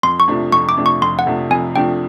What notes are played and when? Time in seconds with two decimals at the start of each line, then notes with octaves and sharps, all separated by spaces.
0.03 F2 C6
0.20 C#6
0.28 C3 F3 A3 D4
0.52 F2 C#6
0.69 D6
0.77 C3 F3 A3 D4
0.86 C#6
1.02 F2 C6
1.19 F#5
1.27 C3 F3 A3 D4
1.51 F2 G#5
1.75 C3 F3 A3 D4 G5